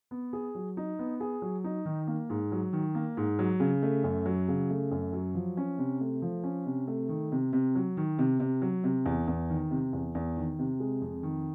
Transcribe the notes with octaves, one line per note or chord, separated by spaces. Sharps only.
B3
G#4
F#3
D#4
B3
G#4
F#3
D#4
D#3
A#3
G#2
F#3
D#3
A#3
G#2
F#3
C#3
A3
F#2
F#3
C#3
A3
F#2
F#3
F3
C#4
C3
A3
F3
C#4
C3
A3
D#3
C3
C3
F#3
D#3
C3
C3
F#3
C3
E2
E2
D#3
C3
E2
E2
D#3
C3
G#3
F2
D#3